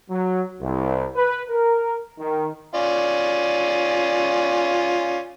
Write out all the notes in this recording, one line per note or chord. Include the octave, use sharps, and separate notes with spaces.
F#3
C2
B4
A#4
D#3
C#4 F4 D5